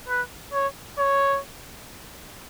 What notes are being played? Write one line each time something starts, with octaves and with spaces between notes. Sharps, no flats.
B4
C#5
C#5